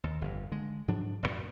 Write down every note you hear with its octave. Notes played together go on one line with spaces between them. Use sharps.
D#2
G1 F2
D3 G#3
G#2 F3 F#3 D4
A1 F#2 A#2